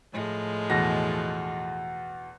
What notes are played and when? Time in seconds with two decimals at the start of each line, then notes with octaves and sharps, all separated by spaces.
0.13 A2 F3 G#3
0.70 E2 B2 A#6